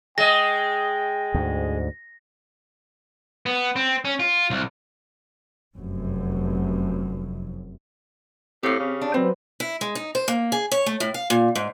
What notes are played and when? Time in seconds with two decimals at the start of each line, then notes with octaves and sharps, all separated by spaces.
0.18 G#3 D#5 G5 A#6
1.34 D2 G#2
3.46 B3
3.76 C4
4.05 C#4
4.20 F4
4.50 C2
5.75 F1 F#2
8.63 A2 C4 G4 F5
8.79 C#3
9.01 D4
9.14 F#3 C4 B4 C5
9.60 E4
9.81 G#3
9.95 D#4
10.15 C5
10.28 A#3
10.52 G#4
10.72 C#5
10.86 A3
11.00 A2
11.14 F5
11.30 A#2
11.55 G#2